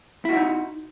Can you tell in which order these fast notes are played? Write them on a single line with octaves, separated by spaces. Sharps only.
E4 F#4 E5 D#4